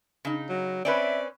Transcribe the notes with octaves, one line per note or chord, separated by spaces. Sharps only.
C#3 D#4
F#3
C4 C#4 B4 D5 E5